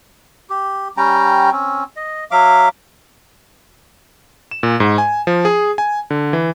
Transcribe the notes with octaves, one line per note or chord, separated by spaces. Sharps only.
G4
G3 C#4 G5 A#5
C4 C#4
D#5
F#3 E5 F5 D6
E7
A#2
G#2
G#5
F3
G#4
G#5
D3
E3